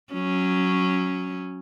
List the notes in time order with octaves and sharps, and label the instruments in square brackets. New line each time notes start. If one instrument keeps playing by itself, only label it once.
[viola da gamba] F#3 C#4